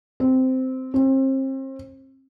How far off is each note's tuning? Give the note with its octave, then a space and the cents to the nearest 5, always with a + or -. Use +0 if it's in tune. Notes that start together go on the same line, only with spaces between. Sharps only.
C4 -10
C4 +35